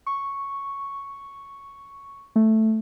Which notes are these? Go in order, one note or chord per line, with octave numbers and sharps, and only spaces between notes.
C#6
A3